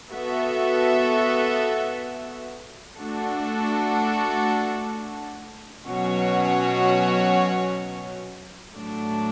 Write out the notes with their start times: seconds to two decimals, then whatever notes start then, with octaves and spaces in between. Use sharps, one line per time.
0.11 B3 F#4 A4 E5
2.98 A3 D4 F#4 A4
5.85 B2 F#3 C#4 F#4 C#5
8.72 A2 F#3 A3 D4